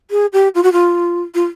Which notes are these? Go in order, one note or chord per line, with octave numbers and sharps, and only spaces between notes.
G#4
G4
F4
F#4
F4
F4